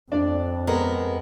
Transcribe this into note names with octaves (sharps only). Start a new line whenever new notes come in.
F2 D4 D5
G#3 B3 A#4